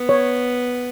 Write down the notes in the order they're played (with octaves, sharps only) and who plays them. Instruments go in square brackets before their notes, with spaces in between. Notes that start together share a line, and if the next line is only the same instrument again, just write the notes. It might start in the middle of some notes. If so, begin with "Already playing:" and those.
Already playing: [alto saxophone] B3
[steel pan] C#5